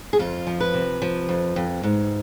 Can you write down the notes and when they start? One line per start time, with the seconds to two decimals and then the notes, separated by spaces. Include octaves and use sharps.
0.13 G#4
0.19 F2 F4
0.47 F3
0.60 B4
0.74 C3
1.02 F3
1.29 F2
1.56 F2
1.83 G#2